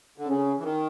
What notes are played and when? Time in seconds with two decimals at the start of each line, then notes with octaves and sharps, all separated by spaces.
0.18 D3
0.27 C#3 C#4
0.59 E3
0.64 D#3